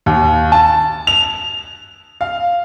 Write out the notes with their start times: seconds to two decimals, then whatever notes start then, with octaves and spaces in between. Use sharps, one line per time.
0.06 D#2
0.52 A5
1.07 F7
2.21 F5